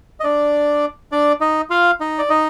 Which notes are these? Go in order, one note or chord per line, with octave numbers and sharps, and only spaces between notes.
D#5
D4 D5
D4 D5
D#4 D#5
F4 F5
D#4 D#5
D5
D#4 D#5